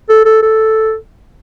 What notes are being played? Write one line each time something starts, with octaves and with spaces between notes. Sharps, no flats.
A4
A4
A4